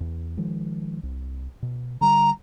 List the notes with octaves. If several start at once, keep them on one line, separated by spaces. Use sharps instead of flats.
E2
D#3 F3 G#3
C2
B2
D3 G3 A#5